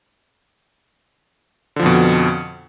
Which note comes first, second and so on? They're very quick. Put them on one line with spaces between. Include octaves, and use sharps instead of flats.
D3 F3 F2 B2